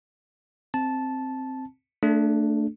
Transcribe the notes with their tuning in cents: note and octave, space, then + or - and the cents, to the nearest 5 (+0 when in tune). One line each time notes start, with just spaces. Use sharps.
C4 +0 A5 -10
A3 +20 D4 +0 A4 -40